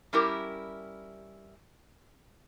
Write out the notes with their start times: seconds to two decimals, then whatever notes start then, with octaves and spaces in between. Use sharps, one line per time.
0.13 G3 C#4 E4 G4 A#4